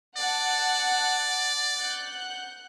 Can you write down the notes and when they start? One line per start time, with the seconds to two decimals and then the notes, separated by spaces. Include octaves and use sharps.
0.17 D5 F#5 A5
1.78 F#5 F#6 G6